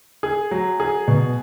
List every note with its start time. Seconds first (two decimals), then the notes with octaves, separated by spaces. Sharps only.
0.23 G#4
0.51 F#3
0.80 G#4
1.08 B2